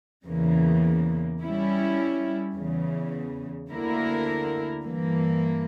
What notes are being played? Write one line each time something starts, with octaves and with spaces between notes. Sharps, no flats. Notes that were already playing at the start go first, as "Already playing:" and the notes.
E2 C#3 E3 A#3
G3 C#4 E4
E2 C#3 E3
D2 D3 A#3 E4 A#4
G2 E3 A#3